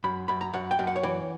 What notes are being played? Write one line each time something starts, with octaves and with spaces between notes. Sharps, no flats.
F#2 B5
F#2 B5
A#5
F#2 F#5
G5
F#2
F#5
C#5
E3 D5